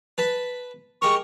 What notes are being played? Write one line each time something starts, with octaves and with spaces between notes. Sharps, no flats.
B4 A5 B5
G#3 G4 A#4 C#6